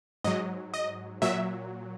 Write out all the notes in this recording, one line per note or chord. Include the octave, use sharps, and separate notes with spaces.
G#2 F#3 D#5
D#5
A#2 F#3 E5